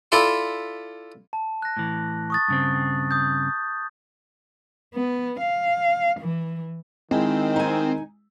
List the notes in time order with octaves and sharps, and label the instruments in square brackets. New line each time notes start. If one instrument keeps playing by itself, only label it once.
[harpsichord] E4 F4 A4 D5 E5 C6
[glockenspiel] A5
F#6 A#6
[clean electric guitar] A2 E3
[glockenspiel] C#6 D#6 A6
[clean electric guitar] G2 C#3 C4
[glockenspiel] D#6 G6
[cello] B3
F5
E3
[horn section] D#3 [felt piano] G#3 E4 [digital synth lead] C4
[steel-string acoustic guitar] D#4 G#5